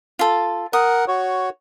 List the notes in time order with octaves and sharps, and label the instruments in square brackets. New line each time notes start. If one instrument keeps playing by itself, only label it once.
[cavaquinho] F4 A4
[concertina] A#4 F#5 [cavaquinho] D#6
[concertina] F#4 C#5